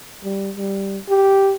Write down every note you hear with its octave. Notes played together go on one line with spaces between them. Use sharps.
G3
G3
G4